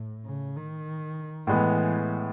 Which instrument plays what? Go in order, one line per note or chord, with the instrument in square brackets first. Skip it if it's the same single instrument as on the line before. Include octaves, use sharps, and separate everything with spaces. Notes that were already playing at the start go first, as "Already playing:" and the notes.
Already playing: [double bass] A2
C#3
D#3
[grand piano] A2 G#3 B3 [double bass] E3